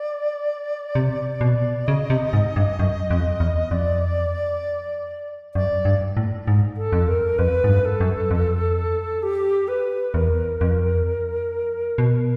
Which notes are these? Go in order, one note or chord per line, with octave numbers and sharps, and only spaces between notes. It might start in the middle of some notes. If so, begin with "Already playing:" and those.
Already playing: D5
C3
B2
C#3 D#5
C3
G#2
G2
F#2
F2
E2
F2 D5
F#2 D5
G2
A2
G#2
A4
F2
A#4
F2 B4
G#2
G2
A4
F#2
F2
G4
B4
E2 A#4
F2
B2